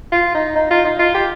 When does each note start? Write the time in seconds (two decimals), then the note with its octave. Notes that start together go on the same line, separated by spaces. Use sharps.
0.12 F4
0.35 D#4
0.56 D#4
0.71 F4
0.85 D#4
0.99 F4
1.14 G4